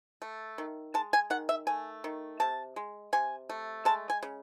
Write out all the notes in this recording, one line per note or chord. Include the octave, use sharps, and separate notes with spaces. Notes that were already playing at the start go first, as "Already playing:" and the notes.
A3
D#3
G#3 A5
G#5
D#3 F#5
E5
A3 G#5
D#3
C3 A5
G#3
C3 G#5
A3
G#3 A5
G#5
C#3